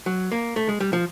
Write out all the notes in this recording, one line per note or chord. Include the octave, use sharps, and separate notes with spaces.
F#3
A#3
A3
G#3
G3
F3